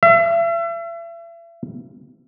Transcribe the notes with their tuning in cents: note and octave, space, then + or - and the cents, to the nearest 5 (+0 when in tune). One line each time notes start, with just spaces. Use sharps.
E5 +40